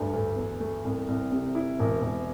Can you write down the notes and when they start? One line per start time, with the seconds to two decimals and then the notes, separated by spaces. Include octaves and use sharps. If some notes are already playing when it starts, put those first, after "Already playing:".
Already playing: D2 G2
0.13 D2
0.36 E2
0.60 A3
0.84 C2
1.08 C2
1.32 C3
1.55 E4
1.79 E1
2.02 E1